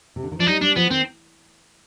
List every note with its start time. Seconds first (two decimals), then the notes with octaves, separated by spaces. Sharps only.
0.16 C3
0.23 D3
0.32 D#3
0.39 F3 D4
0.46 G3 D#4
0.61 G3 D4
0.76 F3 B3
0.91 D#3 C4